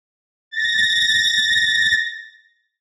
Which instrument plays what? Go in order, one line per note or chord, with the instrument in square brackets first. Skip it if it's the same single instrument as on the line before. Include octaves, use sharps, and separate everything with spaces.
[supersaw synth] A6 A#6